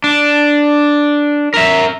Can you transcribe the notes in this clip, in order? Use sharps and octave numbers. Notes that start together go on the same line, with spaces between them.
D4
A#4 E5